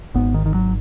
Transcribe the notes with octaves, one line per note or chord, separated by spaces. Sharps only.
G#1 G#2 B3
D#3
D#3
F#3